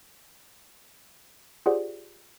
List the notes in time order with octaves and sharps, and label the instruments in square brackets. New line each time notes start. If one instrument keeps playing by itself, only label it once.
[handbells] F4 G4 G#4 C5 D5 F#5